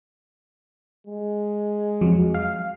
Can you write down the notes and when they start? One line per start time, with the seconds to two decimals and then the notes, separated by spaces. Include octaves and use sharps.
1.07 G#3
2.01 F2 F#3
2.34 F5